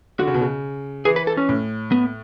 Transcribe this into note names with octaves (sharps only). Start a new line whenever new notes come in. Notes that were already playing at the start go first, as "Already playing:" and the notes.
D3 F#4
C#3
B2
C#3
E3 G#4
B4
A4
C#4
A2
B3